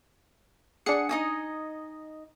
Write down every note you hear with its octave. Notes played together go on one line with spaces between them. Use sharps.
D4 G#4 F#5 C#7
D#4 D#5 G#5